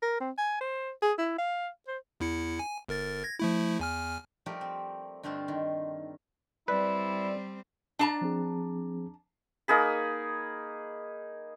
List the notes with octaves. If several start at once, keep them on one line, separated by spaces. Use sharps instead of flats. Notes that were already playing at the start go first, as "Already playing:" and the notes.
A#4
C4
G#5
C5
G#4
E4
F5
C5
E2 E4 C#7
G#5
G1 A#4 A6
G#6 A#6
F3 A3 E4
E2 G#5 F6
F3 G3 A3 G4 A#4
C4
G2 D3 A3 C4 F4
D#3
G3 C4 E4 B4 D5
D4 A5 A#5
F3 C4 G#4
A#3 D#4 G#4 B5